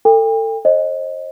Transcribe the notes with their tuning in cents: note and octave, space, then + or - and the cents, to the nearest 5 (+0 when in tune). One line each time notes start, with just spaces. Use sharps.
A4 +30 G5 +35
C5 +35 D#5 +0